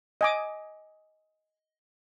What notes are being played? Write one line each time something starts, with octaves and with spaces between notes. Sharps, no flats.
D#5 G#5 D6